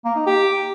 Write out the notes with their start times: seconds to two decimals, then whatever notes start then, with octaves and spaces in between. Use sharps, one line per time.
0.05 A#3
0.16 D#4
0.26 G4